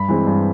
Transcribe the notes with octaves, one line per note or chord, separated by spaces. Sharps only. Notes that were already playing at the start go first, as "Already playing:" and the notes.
Already playing: G2 B5
E3 G#3 C4
G2